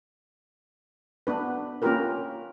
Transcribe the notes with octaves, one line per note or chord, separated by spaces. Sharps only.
B3 D4 B4
A#3 C#4 F4 G4 A#4 B4